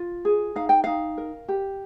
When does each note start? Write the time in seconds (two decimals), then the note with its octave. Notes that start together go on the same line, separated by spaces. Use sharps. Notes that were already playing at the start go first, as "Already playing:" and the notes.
Already playing: F4
0.25 G#4
0.56 D#4 F5
0.69 G5
0.84 D#4 F5
1.18 A#4
1.48 G4